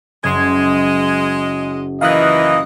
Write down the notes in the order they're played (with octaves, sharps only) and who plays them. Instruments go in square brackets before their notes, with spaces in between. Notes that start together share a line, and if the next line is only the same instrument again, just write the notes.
[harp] F#1 [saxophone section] G#3 D#5 [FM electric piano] C6 G#6
[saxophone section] A#2 D#3 E3 [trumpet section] B4 D#5 [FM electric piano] F5 D#6 F#6